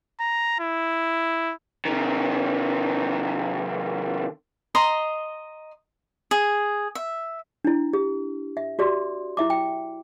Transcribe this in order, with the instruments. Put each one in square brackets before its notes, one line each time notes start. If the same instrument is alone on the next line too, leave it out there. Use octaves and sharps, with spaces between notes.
[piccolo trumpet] A#5
E4
[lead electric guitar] C3 D#3
[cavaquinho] D#5 A#5 C6
G#4
E5
[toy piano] D4 E4
G4
E5
F#4 G4 D5 C6
E4 E5 D6
G5